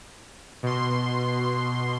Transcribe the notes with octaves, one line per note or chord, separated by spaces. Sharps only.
B2 C6